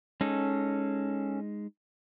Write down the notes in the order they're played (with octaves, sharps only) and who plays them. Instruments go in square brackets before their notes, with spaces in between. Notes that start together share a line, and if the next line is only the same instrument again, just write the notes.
[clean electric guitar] G#3 D#4 [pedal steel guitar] C#4 A4